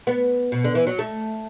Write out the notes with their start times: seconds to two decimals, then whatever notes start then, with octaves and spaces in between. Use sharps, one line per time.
0.07 B3
0.52 B2
0.64 D3
0.75 E3
0.87 F#3
0.99 A3